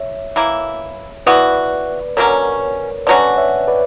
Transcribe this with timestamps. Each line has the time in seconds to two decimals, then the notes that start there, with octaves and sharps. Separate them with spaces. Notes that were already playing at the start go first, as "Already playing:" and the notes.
Already playing: C#5 E5
0.36 E3 A#3 E4
1.26 E3 B3 F#4 B4 D5
2.17 D3 F#3 A#3 C#4 A#4 C#5
3.07 D3 F#3 C#4 F#4 B4 D5
3.37 C#5 E5
3.68 B4 D5